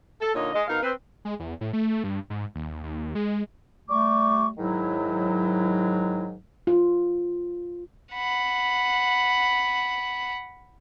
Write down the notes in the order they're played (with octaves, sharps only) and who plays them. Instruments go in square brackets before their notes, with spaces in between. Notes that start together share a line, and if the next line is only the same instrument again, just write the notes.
[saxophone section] A4
A#2 D3 A#3 D#4 C#5 D#5
G#3 D#5
B2 D#4 A#4 F5
C4 B4
[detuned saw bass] G#3
E2
A2
A3
G2
G#2
D#2
D#2
G#3
[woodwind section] G3 A3 [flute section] C#6 D6
[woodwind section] G#2 D#3 F#3 [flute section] E4
[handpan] F4
[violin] F#5 B5